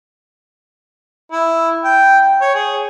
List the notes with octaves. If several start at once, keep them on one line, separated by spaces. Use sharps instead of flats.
E4
G5
C#5
G#4